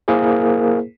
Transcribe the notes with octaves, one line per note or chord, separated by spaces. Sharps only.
A#3 E4 G#4 A#4 C5